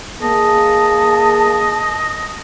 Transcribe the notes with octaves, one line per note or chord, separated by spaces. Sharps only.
A#3 G#4 D#5 A5